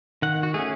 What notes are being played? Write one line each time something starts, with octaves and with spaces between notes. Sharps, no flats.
D#3 F#5
F#4
A3 C#4 G#4